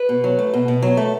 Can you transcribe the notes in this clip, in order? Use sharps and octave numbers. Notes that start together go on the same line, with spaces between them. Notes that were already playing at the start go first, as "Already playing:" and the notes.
Already playing: B4
B2
F#3
A3
B2
B2
F#3
A3